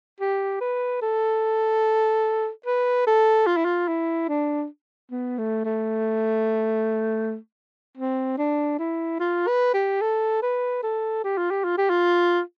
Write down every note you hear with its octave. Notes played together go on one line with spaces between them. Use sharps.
G4
B4
A4
B4
A4
F4
E4
F4
E4
D4
B3
A3
A3
C4
D4
E4
F4
B4
G4
A4
B4
A4
G4
F4
G4
F4
G4
F4